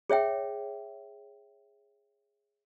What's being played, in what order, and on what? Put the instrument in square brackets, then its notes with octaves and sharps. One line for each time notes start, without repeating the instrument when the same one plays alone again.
[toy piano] G#4 C#5 E5 G5